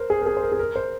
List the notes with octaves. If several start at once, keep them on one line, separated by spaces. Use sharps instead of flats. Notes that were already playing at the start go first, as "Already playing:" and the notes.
Already playing: A#4 C5
G#4
A#4
G#4
C5
A#4
G#4
A#4
C5